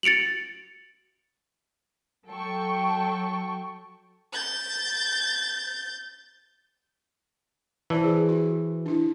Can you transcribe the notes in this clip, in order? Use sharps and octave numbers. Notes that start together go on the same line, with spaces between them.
A6 C#7 D7 F7 F#7
F#3 A4 G5 C#6
G6 A6
E3 C5 D5 A5
G#4
F#4
D4 E4